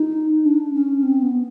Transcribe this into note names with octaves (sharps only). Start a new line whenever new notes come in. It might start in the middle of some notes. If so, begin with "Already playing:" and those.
Already playing: D#4
D4
C#4
C4
B3